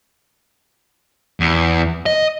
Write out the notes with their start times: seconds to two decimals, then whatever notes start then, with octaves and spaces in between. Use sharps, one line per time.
1.40 E2
2.06 D#5